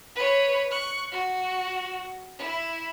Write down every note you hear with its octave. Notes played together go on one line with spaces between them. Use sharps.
B4 C#5
C#6 F#6
F#4
E4